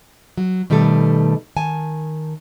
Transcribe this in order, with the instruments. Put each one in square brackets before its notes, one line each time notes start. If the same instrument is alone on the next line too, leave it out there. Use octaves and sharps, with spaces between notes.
[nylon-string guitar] F#3
B2 D#3 G3 A3 A4
D#3 G#5 A5